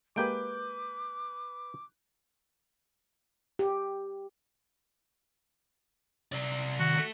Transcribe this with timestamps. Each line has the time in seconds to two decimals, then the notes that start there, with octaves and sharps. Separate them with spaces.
0.16 G#3 A#3 G4 B4 D6 G6 D7
3.59 G4
6.32 C3 D5
6.80 D#3 F#4
6.97 A3